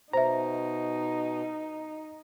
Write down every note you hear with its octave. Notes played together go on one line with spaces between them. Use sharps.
B2 D#4 C5 E5 A#5